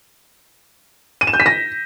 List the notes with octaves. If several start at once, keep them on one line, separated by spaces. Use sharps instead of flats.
D#7
E7
G6
B6
A#6